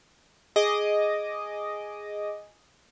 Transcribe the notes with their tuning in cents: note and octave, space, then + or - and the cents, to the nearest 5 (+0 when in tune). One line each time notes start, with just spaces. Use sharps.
G#4 +0 D#5 +0 D6 +0